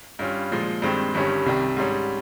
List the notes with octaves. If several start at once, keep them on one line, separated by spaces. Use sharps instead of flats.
G2 G3 C#4 F4
A#2 F3 G#3
G2 D#3 G#3 C4
G1 G2 D#3 G3 C#4
C2 C3 D#3 G3
G#2 G3 C#4